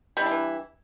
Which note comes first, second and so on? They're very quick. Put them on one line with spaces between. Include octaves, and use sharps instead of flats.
G3 E4 D4 E3